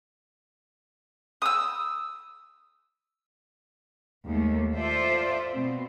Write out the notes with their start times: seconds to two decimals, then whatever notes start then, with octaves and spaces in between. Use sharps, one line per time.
1.42 D#6 E6
4.25 D#2 G#3 A3
4.75 F4 A4 C5 D5 E5
5.52 B2 C4